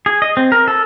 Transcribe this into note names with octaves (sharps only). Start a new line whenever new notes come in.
G#4
D#5
C4
A#4
A4